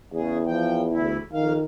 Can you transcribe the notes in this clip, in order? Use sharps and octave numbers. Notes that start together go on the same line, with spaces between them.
E2 C#3 G#4
F3 G5
D2 E4
F2 D#3 F5